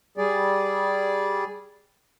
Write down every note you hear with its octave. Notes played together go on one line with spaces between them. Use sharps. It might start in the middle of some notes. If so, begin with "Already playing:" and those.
G3 G#4 D5